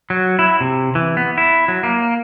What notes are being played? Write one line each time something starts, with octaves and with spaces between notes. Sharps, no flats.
F#3
E4
C3
E3
B3
E4
F#3
A#3